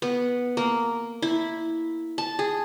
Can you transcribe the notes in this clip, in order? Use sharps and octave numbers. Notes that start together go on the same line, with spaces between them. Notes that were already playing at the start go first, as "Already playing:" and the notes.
B3
A#3
E4
A5
G#4